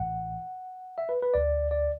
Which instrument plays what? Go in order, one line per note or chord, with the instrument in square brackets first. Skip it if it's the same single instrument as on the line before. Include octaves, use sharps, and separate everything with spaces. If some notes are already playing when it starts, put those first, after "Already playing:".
Already playing: [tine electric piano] A1 A2 E3 F#5
E5
B4
B4
D2 D3 D5
D5